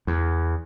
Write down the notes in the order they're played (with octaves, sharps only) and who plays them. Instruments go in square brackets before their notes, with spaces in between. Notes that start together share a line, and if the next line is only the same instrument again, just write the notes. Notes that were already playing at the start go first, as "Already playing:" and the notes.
[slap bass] E2